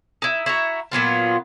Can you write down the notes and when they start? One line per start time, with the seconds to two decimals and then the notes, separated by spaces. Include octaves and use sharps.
0.22 D#4 E4
0.46 E4 F#4 A#5
0.92 A#2 F#3 B3 F4